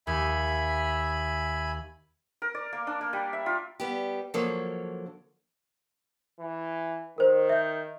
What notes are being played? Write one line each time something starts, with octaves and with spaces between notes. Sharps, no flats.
D#2 E5 G#5 B5
A#4
D5
A#3
D4
A#3
G3
E5
F4
G3 B3 G4
D3 F3 F#3 A#3 A4 C#5
E3
D#3 A#4 C5
E5 G6